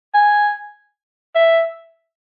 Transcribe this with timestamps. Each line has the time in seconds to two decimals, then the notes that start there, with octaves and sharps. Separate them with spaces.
0.14 G#5
1.35 E5